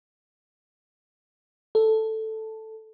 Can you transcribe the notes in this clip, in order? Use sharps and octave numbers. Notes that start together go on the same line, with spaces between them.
A4